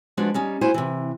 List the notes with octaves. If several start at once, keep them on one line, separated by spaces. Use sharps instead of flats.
F3 G#3 B3 D4 F#4
G3 C#4 D#4
A#3 E4 F#4 C5 G#5
C3 E3